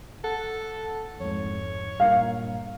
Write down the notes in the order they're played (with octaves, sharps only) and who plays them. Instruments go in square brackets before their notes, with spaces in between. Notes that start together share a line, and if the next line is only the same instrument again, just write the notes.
[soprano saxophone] A4 [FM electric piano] F#5
[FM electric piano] F2 G#2 [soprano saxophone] C#5
[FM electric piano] G2 A#2 A#4 [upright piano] F5